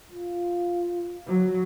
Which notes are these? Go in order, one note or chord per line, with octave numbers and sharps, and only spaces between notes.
F4
F#3